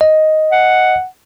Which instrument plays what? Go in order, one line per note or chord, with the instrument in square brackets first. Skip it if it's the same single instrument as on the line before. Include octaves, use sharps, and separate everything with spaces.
[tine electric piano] D#5
[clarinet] F#5